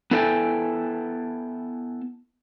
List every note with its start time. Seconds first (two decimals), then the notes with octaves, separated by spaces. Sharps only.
0.11 B3 E4 A4 A#4 G5 G#5